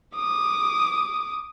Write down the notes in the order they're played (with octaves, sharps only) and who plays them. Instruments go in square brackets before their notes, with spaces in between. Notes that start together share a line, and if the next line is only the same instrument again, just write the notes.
[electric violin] D6 D#6